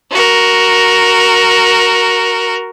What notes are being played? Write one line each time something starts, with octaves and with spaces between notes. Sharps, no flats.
F#4 A#4